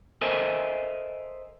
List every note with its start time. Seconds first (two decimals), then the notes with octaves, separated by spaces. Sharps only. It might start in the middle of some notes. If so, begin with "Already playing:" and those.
0.21 A4 A#4 C5 D#5 E5 G#5